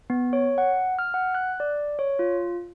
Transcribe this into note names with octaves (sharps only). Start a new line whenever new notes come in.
B3
C#5
F#5
F6
F#5
F#6
D5
C#5
F4